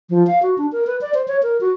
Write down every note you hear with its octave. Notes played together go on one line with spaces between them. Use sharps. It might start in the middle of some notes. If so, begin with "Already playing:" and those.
F3
F5
F#4
D4
A#4
B4
D5
C5
C#5
A#4
F#4